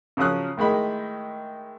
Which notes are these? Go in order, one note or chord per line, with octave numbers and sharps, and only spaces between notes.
C#3 F3 F#3 C#4 D#6 F#6
A2 D#3 G#3 B5